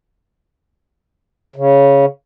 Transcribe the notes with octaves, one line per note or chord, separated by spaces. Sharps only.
C#3